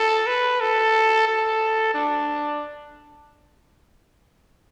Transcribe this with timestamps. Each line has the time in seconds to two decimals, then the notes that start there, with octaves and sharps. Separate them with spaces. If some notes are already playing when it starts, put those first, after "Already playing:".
Already playing: A4
0.27 B4
0.60 A4
1.27 A4
1.94 D4